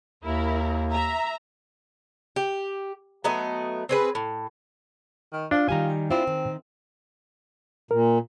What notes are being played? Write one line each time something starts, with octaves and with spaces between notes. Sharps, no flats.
D#2 E4 A#4
E5 A#5
G4
F#3 A3 B3 D#5
C4 G#4 B4
A2
D#3
D4 F4
D#3 G3 G4 G#5 A#5
C4 D4 E4 F4
D#3
A#2 A#4